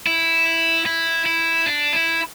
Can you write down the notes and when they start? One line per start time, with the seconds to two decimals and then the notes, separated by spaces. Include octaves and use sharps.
0.07 E4
0.86 E4
1.26 E4
1.66 D4
1.93 E4